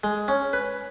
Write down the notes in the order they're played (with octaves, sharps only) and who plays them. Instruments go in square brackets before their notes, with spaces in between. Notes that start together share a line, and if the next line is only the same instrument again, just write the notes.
[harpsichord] G#3
C#4
B4